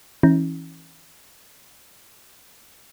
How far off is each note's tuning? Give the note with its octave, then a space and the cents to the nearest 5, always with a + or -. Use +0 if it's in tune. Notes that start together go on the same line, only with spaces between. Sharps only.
E3 +0 C#4 -20 E4 -35